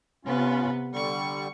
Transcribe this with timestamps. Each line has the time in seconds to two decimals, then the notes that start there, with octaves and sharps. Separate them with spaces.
0.25 C3 B3 C#4 F4
0.92 D3 G3 C#6